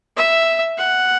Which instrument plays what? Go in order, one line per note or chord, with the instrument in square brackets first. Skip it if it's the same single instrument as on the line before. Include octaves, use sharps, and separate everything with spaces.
[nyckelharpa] E5
F#5